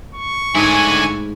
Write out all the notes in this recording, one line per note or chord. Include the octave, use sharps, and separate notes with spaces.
C#6
G#2 D3 A3 E4 G#5